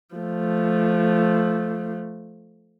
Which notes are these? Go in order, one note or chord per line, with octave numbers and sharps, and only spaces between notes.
F3 A3